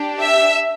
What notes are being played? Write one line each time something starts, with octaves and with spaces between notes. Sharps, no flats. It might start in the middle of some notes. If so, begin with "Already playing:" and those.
Already playing: D4 G4
E5